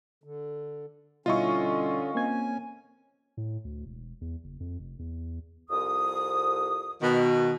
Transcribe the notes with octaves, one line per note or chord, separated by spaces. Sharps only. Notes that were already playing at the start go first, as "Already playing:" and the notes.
D3
B2 D3 G3 C#4 E4 F4 D#5 C#6
A#3 C4 C#4 G#5 G#6
A2
D2
E1
E2
F#1
F2
F1
E2
C2 F2 D#6
B2 D#3